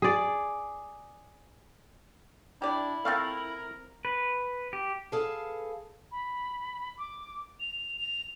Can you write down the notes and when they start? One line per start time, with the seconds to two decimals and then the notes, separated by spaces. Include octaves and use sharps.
0.02 G#4 D5
2.62 D4 E4 G4 D5
3.05 A3 C4 F4 A4 A#4 F5
4.05 B4
4.73 G4
5.12 G#4 A4 B4 F5 A5
6.11 B5
6.98 D6
7.60 F7
7.97 F7